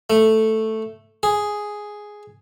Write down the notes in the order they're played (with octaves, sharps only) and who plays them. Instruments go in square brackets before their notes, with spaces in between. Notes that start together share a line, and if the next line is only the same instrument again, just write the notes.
[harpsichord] A3
G#4